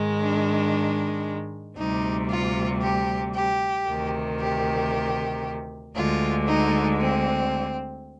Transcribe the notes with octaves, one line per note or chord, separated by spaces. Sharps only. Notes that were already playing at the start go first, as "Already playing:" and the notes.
Already playing: G#2 D#3 G#3
D4
D2 C3 G3 D#4
F4
G4
G4
D2 C3 D#3
G4
D2 D3 G#3 F4
D#4
C4